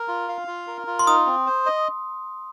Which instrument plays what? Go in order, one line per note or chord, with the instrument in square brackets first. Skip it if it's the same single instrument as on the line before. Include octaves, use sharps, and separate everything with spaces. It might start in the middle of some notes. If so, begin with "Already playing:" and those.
Already playing: [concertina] A#4
F4
F5
F4
A#4
F4
[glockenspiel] C6
[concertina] D#4 [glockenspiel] D#6
[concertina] C4
C5
D#5